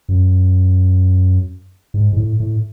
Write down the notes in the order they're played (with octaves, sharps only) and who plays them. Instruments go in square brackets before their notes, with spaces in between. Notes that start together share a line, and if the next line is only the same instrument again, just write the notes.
[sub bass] F#2
G#2
G#2
A2
A2